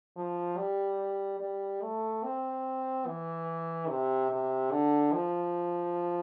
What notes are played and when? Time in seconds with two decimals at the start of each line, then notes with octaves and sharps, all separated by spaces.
0.17 F3
0.57 G3
1.40 G3
1.82 A3
2.24 C4
3.06 E3
3.88 C3
4.30 C3
4.71 D3
5.13 F3